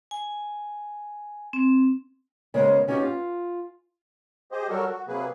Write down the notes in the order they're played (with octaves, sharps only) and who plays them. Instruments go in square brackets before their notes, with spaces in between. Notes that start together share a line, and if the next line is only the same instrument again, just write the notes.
[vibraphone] G#5
C4
[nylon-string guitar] C#3 G#3 B3 A#4 C5
B3 C#4 D#4 F#4 G4
F4
[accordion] G4 G#4 C5 D#5
F#3 G3 F#4 A4 A#4
F#4
C3 F#3 A#3 G#4 B4